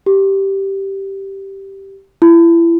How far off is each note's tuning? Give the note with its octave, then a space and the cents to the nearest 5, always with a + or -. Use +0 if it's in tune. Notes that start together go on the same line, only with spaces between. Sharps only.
G4 -10
E4 +30